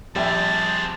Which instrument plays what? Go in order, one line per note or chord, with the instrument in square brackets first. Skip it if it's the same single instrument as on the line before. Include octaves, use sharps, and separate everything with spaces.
[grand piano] A#1 E5 G5 [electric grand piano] G3 [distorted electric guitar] C4 G#4 [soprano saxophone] A5